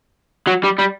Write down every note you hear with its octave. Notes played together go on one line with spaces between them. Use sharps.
F#3
G3
G3